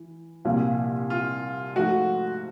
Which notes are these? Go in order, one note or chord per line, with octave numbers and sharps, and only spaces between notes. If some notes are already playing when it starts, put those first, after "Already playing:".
Already playing: E3
C2 A#2 F3 A#3
F4
G#2 F3 A3 F#4